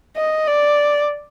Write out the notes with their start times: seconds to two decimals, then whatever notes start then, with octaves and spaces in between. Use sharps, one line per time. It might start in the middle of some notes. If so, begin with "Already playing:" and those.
0.17 D#5
0.48 D5